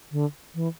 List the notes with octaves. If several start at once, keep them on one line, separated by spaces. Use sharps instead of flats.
D3
E3